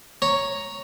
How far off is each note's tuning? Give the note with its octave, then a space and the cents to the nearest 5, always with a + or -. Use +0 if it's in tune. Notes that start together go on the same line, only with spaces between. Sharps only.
C#5 +0 A#5 +0